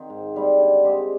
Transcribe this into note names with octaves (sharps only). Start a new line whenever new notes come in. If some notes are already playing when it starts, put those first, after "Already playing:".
Already playing: D#3 C4
G#2
D#3 G3 C4
D3
G#3 C4 G4